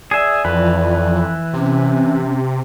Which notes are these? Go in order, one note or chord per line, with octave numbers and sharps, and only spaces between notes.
G#4 D5 E5
F2 E3 B4
C3 C#4